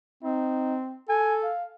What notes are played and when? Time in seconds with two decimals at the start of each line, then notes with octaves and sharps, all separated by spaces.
0.23 C4 D#4
1.09 A4 G#5
1.43 F5